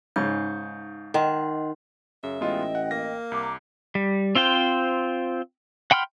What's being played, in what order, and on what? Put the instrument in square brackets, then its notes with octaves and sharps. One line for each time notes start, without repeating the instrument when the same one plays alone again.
[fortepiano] G#2 C#3 [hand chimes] D#4 D#6 G6
[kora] D#3 [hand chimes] D#5 F#5 C6
[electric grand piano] F#2 [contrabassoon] C#3 [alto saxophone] E5
[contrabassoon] A1 [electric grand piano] G#3 B3 F4 [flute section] D#5 G5
[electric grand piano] F#5
[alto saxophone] A#3 [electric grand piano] A#6
[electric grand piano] C2 [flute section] A#5 D6
[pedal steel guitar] G3
C4 F4 C5 G5
F#5 G5 B5 C6 F6